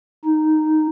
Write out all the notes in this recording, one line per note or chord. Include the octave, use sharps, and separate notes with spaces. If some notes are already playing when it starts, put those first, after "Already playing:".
D#4